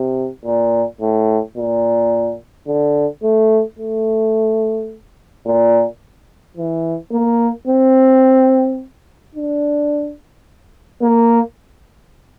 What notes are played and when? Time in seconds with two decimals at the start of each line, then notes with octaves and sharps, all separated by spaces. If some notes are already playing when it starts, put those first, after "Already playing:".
Already playing: C3
0.45 A#2
1.01 A2
1.57 A#2
2.67 D3
3.23 A3
3.79 A3
5.46 A#2
6.57 E3
7.12 A#3
7.67 C4
9.35 D4
11.02 A#3